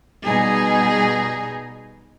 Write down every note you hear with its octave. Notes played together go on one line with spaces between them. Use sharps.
B2 G3 D#4 G#4